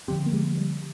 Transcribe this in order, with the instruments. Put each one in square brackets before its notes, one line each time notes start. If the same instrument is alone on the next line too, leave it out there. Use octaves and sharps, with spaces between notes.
[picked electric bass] D3 F3 C4 [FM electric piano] G4
[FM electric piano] A#3
G#3
G3